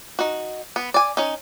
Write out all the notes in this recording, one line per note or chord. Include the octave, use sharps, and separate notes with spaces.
D#4 F#4
B3
D5 G#5
C#4 D#4